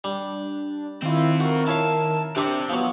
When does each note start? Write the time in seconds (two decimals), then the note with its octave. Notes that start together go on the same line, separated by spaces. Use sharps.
0.04 G3 D4
1.03 D#3 C4 E4 F4
1.40 F#4 A#4
1.67 E4 C#5 F5 A5
2.36 C3 C4 D4 G4 C5 D5
2.69 F3 F#3 B3